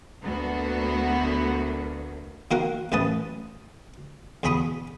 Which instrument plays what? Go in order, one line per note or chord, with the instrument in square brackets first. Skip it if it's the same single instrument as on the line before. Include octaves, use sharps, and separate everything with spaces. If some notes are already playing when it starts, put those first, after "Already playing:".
[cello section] D2 A#3 [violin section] B3 F#4
[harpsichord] D#3 A#3 F#4 A#4 F#5
A1 F#2 C#4 B4 A5 D#6
E2 B2 G#4 B5 C#6 D#6